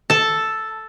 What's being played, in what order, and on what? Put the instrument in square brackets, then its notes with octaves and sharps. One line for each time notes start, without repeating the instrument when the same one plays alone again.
[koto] A4 A5